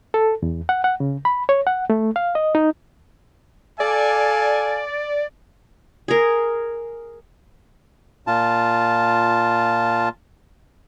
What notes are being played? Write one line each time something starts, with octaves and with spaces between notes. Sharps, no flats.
A4
E2
F#5
F#5
C#3
B5
C#5
F#5
A3
F5
D#5
D#4
A4 D5 F5 G#5
G#4 A#4
A#2 F4 A5